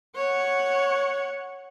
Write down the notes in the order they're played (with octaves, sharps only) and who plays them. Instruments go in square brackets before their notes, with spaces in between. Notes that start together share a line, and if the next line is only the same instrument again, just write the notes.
[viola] C#5 F#5